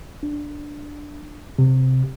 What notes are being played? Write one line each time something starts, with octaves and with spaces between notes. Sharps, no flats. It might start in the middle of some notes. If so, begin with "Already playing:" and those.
D4
C3